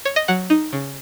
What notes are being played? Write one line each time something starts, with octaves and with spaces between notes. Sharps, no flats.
C#5
D#5
F#3 F#5
D#4
C#3